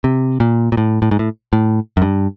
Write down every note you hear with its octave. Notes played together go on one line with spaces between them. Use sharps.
C3
A#2
A#2
A2
A2
G#2
A2
A2
F#2
G2